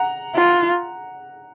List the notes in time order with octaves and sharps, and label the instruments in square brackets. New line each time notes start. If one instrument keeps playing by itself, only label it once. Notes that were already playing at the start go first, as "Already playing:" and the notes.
Already playing: [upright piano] F#5 A#5
[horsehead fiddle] F4